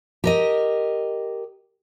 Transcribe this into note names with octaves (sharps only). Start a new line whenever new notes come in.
G4 A#4 D#5